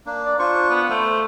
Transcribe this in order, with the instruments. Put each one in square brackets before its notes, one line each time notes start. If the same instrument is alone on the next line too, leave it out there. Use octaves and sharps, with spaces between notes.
[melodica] A#3 D4
[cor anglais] D5
[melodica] D4 F4 C#6 [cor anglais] C5
[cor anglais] B3
[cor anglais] A3 [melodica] C5